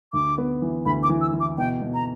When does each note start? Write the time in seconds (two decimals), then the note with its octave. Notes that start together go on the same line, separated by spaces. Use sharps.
0.13 D2 D6
0.38 B3
0.62 E3
0.86 D2 B5
1.03 D6
1.09 E3
1.21 E6
1.33 E3
1.40 D6
1.58 B2 G5
1.82 B2
1.94 A#5